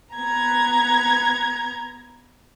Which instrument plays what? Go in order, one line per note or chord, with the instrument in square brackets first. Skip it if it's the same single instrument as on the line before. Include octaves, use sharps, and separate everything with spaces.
[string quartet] B3 A#5 G#6